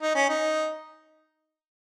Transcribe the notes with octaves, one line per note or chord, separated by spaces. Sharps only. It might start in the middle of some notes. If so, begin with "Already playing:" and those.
D#4
C#4
D#4